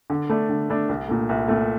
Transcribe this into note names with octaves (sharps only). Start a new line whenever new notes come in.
D3
A3 D4
D3
A3 D4
C2
A#2 A3
C2
A#2 A3